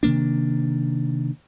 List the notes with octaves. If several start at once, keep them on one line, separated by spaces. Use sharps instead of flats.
C3 D#3 A#3 D4